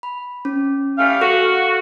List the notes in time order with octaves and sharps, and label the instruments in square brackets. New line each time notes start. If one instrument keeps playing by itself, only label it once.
[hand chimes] B5
C#4
[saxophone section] E3 G3 A3 [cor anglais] F5
[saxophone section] F#4 [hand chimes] A4 F#6